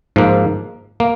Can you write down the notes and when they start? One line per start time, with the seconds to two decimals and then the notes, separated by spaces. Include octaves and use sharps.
0.16 G#2 F3 A#3
1.00 A#3